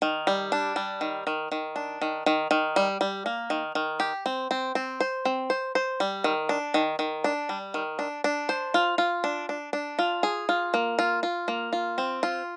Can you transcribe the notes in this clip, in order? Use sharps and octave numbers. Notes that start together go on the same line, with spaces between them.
D#3
G3
D4
G3
D#3
D#3
D#3
D4
D#3
D#3
D#3
G3
G3
A#3
D#3
D#3
G4
C4
C4
C4
C5
C4
C5
C5
G3
D#3
D4
D#3
D#3
D4
G3
D#3
D4
D4
C5
F4
F4
D4
D4
D4
F4
G#4
F4
A#3
F4
F4
A#3
F4
C4
F4